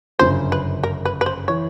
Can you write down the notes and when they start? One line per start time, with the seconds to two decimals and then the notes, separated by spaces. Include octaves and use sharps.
0.19 G1 F#2 C#3 C5
0.52 B4
0.83 A#4
1.05 B4
1.21 B4
1.26 C5
1.48 E3 C#5